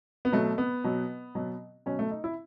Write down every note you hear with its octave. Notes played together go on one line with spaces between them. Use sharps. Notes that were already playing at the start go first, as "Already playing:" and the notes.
B3
B2 F#3 A3
B3
B2 F#3
B2 F#3
B2 F#3 C#4
A3
D#4
E4